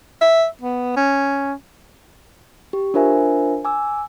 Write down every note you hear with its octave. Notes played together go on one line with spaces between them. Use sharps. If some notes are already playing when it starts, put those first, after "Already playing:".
E5
B3
C#4
G4
D4 F4 A#4 C5 E5 G#5
G#5 D6 E6